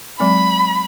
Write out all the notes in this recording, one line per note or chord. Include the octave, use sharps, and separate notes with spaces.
F#3 G#3 C4 B5